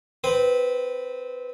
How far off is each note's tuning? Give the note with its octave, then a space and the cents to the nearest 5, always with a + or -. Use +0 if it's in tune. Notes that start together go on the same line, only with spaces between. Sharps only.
C4 -15 B4 +0